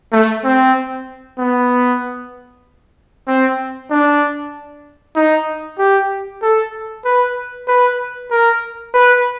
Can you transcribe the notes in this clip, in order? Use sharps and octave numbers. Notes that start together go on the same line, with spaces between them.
A3
C4
B3
C4
D4
D#4
G4
A4
B4
B4
A#4
B4